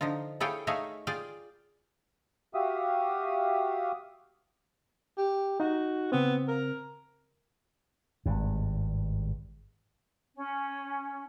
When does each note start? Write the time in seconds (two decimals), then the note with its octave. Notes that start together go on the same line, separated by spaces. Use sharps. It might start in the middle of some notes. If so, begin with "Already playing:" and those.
0.01 D3 F3 D#4 F4
0.40 E4 G#4 A4 C#5 F5 G5
0.67 A3 D#4 G#4 C#5 E5 F5
1.07 F4 G#4 D5 F5 G5
2.54 F#4 G4 E5 F5 D#6
5.18 G4
5.60 D#4 F#4
6.12 C#3 B3 C4
6.48 A#4
8.26 G#1 G2
10.35 C#4